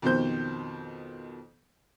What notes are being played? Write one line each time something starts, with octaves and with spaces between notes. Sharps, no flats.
F2 B2 D#3 C5 G6